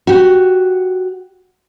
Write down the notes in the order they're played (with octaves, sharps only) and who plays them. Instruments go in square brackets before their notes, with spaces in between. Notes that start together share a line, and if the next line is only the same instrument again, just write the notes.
[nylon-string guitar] F#4 G4